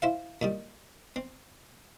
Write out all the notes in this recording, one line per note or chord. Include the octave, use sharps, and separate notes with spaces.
E4 C5 F5
A#2 D#3 G3
C4